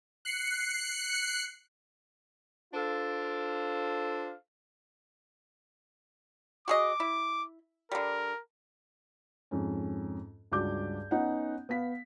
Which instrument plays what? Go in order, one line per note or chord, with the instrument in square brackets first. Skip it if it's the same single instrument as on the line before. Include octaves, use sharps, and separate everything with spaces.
[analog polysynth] F#6 C7 C#7
[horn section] D4 F4 A4 C5 F5
[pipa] F#4 G#4 D#5 [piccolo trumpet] D6
[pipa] E4
[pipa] D3 G3 [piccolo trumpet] A#4
[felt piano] F2 G#2 C#4
C#2 G2 F#4 D6 G6
B3 C#4 D#4 F#5
B3 F5 B6